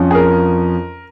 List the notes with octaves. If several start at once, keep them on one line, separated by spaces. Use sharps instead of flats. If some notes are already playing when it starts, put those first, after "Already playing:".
Already playing: F2 F3 C#4
G#4
A#4